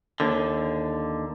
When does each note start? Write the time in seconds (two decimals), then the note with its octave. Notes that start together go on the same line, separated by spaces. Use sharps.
0.20 D#2 D3